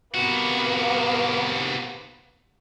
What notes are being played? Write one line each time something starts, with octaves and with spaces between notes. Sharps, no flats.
C3 A#3 B3 F#4